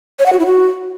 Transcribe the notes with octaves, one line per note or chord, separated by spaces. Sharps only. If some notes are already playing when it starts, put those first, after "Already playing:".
C#5
F#5
F#4
E4
F#4